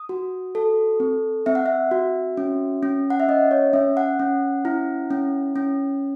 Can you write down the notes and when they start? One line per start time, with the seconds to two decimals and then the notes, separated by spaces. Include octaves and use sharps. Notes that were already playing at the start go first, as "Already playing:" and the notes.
Already playing: D#6
0.09 F#4
0.55 A4
1.00 C4
1.46 C4 E5
1.55 F#5
1.66 E5
1.91 F#4
2.37 C#4
2.83 C#4
3.10 F#5
3.20 E5
3.28 C#4 D#5
3.51 C#5
3.73 C#4 E5
3.97 F#5
4.19 C#4
4.65 E4
5.11 C#4
5.56 C#4